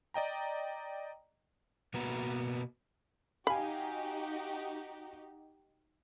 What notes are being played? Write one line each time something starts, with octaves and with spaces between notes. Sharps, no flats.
D5 D#5 G5 A#5
B2 A#3 B3 F#4 B4 A#5
D#4 F#4 G4 F5 G#5 B5